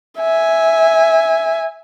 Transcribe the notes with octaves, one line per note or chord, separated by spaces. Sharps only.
E5 G#5